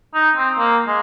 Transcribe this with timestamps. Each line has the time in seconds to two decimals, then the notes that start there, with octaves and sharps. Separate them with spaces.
0.14 D#4
0.36 C4
0.58 A#3
0.87 G#3